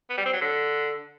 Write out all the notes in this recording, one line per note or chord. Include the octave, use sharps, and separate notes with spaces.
B3
G3
C4
F#3
D3